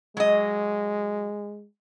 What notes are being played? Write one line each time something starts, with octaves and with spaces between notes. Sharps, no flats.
F#3 G#3 D#5